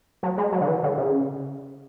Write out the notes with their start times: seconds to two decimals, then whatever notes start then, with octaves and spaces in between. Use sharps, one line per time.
0.23 F#3
0.38 G#3
0.52 F#3
0.61 D3
0.68 E3
0.83 D3
0.98 C#3